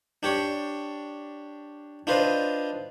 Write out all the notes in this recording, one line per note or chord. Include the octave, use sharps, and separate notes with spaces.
D4 G4 C#5
D4 F4 B4 C5 D#5